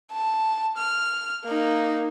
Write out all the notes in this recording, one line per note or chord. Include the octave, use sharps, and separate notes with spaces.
A5
F6
A#3 D#4